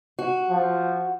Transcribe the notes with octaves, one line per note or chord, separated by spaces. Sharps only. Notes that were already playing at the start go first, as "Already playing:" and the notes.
F#4
F3